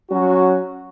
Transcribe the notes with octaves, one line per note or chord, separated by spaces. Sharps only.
F#3 C#4 F#4